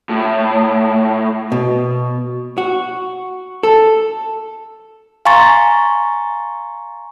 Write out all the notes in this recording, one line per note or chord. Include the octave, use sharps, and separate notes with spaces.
A2
B2
F#4
A4
F5 G#5 A#5 C6 C#6 A6